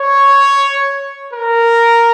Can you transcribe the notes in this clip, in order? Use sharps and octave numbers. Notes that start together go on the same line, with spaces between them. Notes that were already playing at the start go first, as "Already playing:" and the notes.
Already playing: C#5
A#4